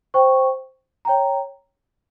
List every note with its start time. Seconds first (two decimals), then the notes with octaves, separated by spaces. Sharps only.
0.14 C5 G5 C#6
1.05 C#5 G5 A#5